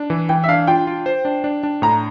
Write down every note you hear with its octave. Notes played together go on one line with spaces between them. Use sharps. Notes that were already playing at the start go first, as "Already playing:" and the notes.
Already playing: D4
E3
E3 G5
E5
D4 F5
F4 G5
F4
C5
D4
D4
D4
A2 A#5